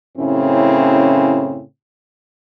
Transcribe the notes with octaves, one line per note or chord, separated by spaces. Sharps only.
F#2 A2 C#3 C4 E4